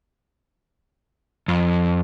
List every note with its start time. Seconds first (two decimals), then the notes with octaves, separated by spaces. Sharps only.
1.48 F2